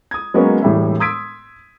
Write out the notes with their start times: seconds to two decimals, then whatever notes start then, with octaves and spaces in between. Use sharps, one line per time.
0.11 D#6 G#6
0.34 F#3 G#3 A#3 B3 C#4
0.62 E1 A2 G3 E5
1.00 C6 D#6 E6 G#6 B6 D7